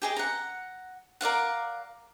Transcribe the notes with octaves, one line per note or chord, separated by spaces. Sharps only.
G4 G#4 D#5
F#5 A#5
A#4 D5 F5 F#5